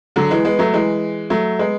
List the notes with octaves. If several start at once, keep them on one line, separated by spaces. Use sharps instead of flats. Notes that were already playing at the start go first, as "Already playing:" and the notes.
D3 F#3
E3 G#3
G#3 B3
F#3 A3
E3 G#3
F#3 A3
G#3 B3